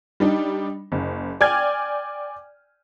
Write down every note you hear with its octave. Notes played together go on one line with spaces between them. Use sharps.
G3 D4 D#4
F#1
D5 G5 G#5 F6 G#6